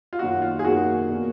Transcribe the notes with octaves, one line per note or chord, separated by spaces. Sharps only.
F4
F#2 D#3 A#3 D#4 F#4
F4
G#4
F#2 D#3 A#3 D#4 F#4
B2 A#3 D4